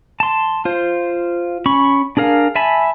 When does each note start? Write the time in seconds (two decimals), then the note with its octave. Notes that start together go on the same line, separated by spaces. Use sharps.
0.20 A5 C6
0.65 F4 C5
1.66 C#4 B5 C#6
2.17 D4 G#4 A#4 F5
2.55 E5 G#5 A5 B5